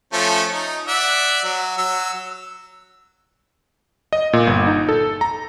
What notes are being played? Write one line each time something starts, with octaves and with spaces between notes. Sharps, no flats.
F3 A3 C#4
D#4
D5 E5 F#5
F#3
F#3 E6
D#5
A#2
G1
D#4
A4
A#5